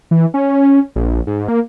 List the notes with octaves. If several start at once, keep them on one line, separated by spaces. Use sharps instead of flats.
E3
C#4
A#1
G#2
A#3